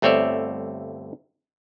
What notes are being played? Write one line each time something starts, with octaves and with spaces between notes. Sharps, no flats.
G1 A3 C4 C#5 D5 E5